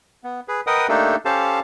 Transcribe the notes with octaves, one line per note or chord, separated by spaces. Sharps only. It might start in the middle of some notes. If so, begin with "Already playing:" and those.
B3
G#4 B4
A#4 B4 D#5 F#5 G5 D#6
A3 A#3 D4 D#4 G4 A4
C#4 G4 A4 C5 F5 A5